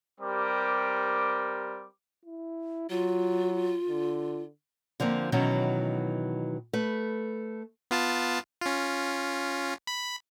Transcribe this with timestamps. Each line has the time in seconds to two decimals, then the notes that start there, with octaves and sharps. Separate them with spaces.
0.20 G3 C4 G4 A#4 D6
2.25 E4
2.90 F#3 F4
3.88 D3
5.00 D3 F3 A#3 C4
5.32 B2 D#3 E3 F#3 C#4
6.73 A3 B4
7.91 B3 F4 A5
8.61 C#4 F4
9.87 B5